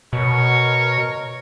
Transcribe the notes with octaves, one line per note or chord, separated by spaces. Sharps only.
B2 A#4 C#5 C#6